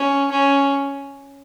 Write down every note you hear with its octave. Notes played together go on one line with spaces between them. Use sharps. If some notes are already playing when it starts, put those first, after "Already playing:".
Already playing: C#4
C#4